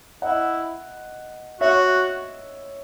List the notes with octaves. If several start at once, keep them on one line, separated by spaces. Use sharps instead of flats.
E4 D#5 F#5
F#4 C#5 E5